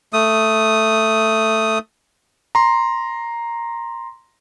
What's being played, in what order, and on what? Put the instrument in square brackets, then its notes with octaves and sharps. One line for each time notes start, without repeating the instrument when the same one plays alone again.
[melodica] A3 D#6
[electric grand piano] A#5 C6